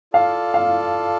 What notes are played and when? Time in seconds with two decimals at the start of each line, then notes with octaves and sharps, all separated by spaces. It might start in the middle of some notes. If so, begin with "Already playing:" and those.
0.13 F4 A4 D5 F5 A5
0.54 F5